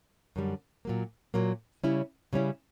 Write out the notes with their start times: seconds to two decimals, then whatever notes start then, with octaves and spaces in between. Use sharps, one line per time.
0.36 F#2 D3 G3
0.85 A#2 F#3 A#3
1.34 A#2 F#3 A#3
1.84 C#3 G3 C#4 E4
2.33 C#3 G3 C#4 E4